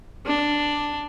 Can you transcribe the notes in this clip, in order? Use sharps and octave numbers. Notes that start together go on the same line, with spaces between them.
D4